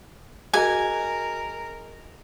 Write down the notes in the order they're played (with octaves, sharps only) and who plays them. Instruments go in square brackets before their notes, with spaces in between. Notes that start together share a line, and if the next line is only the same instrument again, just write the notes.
[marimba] F#4 [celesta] G#4 D#5 [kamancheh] A#4 [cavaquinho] G#5